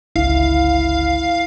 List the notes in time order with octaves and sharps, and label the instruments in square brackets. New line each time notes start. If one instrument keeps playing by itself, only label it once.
[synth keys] G1 C#2 [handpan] E4 [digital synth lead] F5